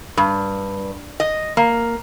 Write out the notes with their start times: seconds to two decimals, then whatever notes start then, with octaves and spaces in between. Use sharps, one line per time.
0.17 G2
1.20 D#5
1.57 A#3